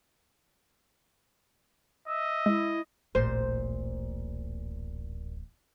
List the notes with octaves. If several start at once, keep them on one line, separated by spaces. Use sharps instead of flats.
D#5 E5
G#3 E4
D1 A1 A#2 C5